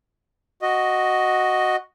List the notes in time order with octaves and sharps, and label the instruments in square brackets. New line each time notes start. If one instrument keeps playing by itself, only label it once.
[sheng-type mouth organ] F#4 D#5